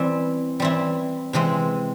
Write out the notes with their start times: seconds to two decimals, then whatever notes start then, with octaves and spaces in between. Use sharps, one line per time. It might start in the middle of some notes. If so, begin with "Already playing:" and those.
Already playing: E3 G3 C4 E4
0.60 E3 G3 C4 E4
1.33 C3 E3 G#3 C4